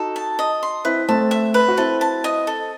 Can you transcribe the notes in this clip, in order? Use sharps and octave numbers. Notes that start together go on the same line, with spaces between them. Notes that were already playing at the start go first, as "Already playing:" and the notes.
Already playing: D#4 F#4 A4
A5
D#5
C6
C4 E4 B4
A3 C4 A5
E5
B4
F#4
C4 E4 A4
A5
D#5
A4